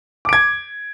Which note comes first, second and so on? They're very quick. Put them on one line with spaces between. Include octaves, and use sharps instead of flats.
D6 D7 G#6